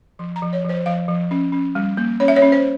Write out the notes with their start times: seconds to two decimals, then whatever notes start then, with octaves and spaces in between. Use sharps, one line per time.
0.19 F3 C6
0.36 A#5
0.42 F3
0.53 C#5
0.64 F3 C5
0.86 F3 F5
1.08 F3
1.31 C#4
1.52 C#4
1.75 G3
1.97 A#3
2.20 C#4 C#5
2.28 E5
2.36 C#5
2.42 C#4
2.52 C5